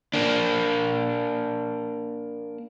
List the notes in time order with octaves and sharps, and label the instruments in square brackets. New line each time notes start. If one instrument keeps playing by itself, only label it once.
[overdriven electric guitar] A#3 D4